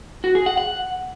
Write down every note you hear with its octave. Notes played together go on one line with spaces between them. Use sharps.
F#4
G#4
F#5
F#5